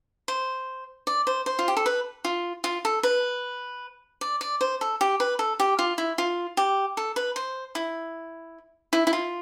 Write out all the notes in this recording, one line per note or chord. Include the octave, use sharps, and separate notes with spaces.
C5
D5
C5
C5
F4
G4
A4
B4
F4
F4
A4
B4
D5
D5
C5
A4
G4
B4
A4
G4
F4
E4
F4
G4
A4
B4
C5
E4
E4
E4
F4